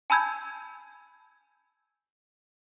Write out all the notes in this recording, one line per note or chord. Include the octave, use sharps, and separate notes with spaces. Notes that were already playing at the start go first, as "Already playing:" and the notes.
G#5 A5 B5 E6 G6 G#6